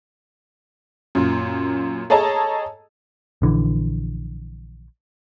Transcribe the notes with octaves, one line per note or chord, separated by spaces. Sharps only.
F#2 A#2
G#4 A4 C#5 D#5 A5 A#5
A#1 D3 E3